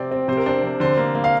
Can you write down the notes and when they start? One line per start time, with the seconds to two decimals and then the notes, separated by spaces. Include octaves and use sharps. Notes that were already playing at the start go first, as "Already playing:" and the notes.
Already playing: C3 C4 D5
0.11 C4
0.28 C3 C5
0.37 A#4
0.46 D4 C5
0.63 C3
0.80 D3 C5
0.97 A#3
1.15 A#3
1.24 F5